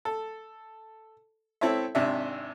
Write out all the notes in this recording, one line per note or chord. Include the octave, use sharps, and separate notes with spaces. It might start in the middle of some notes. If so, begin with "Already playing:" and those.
A4
C4 E4 A4 C#5 E5
G#1 C3 D4 E5